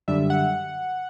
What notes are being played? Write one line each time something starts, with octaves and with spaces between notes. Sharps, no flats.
F#2 D3 G3 E5
F#5